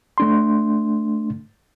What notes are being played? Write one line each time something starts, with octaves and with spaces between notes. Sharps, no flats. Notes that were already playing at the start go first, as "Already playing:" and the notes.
A3 D4 C6